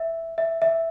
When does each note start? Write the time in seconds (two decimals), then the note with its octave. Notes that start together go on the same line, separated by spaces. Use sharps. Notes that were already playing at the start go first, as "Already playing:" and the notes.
Already playing: E5
0.38 E5
0.62 E5